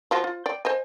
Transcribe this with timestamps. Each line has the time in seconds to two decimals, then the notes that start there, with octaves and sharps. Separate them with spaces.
0.11 F3 F4 F#4
0.24 F4
0.46 D5 G5
0.65 C5 D#5 G#5